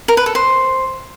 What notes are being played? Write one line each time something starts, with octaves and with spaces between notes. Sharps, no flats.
A#4
B4
A4
C5